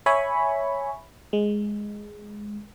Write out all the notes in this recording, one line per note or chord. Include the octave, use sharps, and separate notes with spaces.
C#5 E5 G#5 B5 C#6
G#3